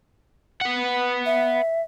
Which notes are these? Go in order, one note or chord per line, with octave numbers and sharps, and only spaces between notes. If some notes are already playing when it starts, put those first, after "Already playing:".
B4 F#5
E5